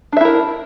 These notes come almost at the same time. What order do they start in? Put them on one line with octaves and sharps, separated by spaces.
D4 E5 E4 A#4